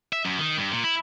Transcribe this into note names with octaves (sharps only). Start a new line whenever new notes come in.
E5
F#2
D#3
G2
A#2
E4